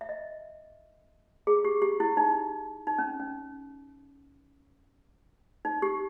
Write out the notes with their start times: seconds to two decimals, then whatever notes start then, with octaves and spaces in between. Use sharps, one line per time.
0.01 E5
0.09 D#5
1.47 G#4
1.65 G4
1.82 G4
2.00 E4
2.17 D#4
2.87 D#4
2.99 C#4
3.20 C#4
5.65 D#4
5.82 G4